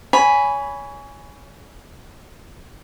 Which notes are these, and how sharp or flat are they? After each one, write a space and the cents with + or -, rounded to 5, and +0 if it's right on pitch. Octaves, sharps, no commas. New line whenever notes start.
C#5 +30 G#5 +0 B5 +0